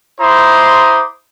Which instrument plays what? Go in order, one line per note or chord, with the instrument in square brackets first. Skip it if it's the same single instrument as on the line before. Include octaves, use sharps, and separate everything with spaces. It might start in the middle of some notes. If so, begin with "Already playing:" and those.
[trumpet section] E4 C5 A#5 C6 D6 D#6